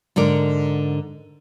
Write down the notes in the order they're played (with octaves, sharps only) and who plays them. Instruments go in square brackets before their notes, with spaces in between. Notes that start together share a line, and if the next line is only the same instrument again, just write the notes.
[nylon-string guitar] G#2 D3 A#4 D5